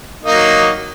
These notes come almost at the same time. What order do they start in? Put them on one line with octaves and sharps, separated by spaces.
D#4 A#3 F#3